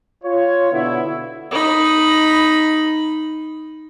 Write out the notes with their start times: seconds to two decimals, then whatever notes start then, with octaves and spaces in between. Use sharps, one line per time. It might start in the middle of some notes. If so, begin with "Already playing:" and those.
0.24 F4 C#5
0.72 B2 D3 B3 E4
1.51 D#4 B5